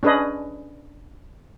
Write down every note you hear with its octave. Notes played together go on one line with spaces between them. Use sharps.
C#4 D4 G#4 B4 D#5